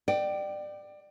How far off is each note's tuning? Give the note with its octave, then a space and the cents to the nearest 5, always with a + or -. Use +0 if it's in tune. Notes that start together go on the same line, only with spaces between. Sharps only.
D5 +25 G5 -25